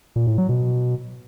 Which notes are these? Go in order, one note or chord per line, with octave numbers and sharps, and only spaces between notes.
A#2
A2
F#3
B2